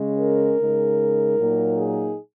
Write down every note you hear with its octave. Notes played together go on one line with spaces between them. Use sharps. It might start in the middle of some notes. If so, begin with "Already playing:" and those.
Already playing: C#3 G#3 C#4
A#4
C#3 G#3 D#4
A#2 F#3 A#3 D#4
G#4